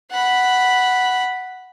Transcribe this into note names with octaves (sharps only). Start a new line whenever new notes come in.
F#5 B5